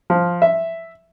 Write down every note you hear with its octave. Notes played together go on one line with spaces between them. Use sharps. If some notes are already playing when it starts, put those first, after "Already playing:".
F3
E5